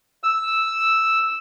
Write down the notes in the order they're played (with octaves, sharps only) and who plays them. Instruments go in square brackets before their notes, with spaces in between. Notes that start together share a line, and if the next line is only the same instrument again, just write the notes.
[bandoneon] E6